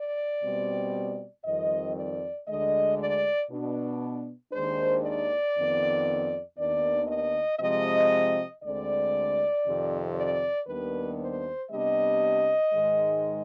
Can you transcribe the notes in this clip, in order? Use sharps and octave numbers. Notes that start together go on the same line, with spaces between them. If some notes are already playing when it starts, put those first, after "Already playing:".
Already playing: D5
B2 G3 C4
F2 D#3 G3 C4 D#5
D5
D2 D3 G#3 D#5
D5
B2 B3 D4
D#2 D#3 G#3 D4 C5
D5
F2 D#3 B3
D#2 D#3 B3 D4 D5
D#5
C3 F3 G#3 C4 D#5
D2 D3 G#3 C4 D5
F2 C3 D#3
D5
D#2 D#3 G3 B3 D4 B4
C5
C3 G3 B3 D4 D#5
G#2 D#3 G#3